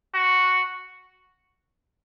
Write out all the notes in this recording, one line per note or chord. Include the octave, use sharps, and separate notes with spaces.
F#4